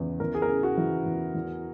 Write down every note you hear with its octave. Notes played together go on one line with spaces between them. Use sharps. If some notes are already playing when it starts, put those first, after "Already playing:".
Already playing: E2 C#3 E3
E2 A#4
G#4
A#4
C#3 G#4
F#4
E3
E2
E2